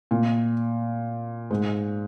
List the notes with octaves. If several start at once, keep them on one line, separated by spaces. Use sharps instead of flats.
A#2
G#2